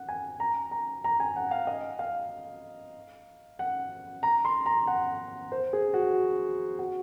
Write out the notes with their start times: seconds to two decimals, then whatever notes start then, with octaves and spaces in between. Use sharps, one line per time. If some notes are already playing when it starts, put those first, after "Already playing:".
Already playing: F#5
0.09 G#5
0.40 A#5
0.71 A#5
1.04 A#5
1.20 G#5
1.36 F#5
1.51 F5
1.67 D#5
1.99 F5
3.59 F#5
4.23 A#5
4.45 C6
4.66 A#5
4.87 F#5
5.52 C5
5.73 G#4
5.94 F#4
6.79 F#4